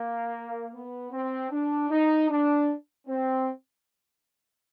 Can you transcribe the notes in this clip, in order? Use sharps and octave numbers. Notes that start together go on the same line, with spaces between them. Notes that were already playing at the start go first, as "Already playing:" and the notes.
Already playing: A#3
B3
C4
D4
D#4
D4
C4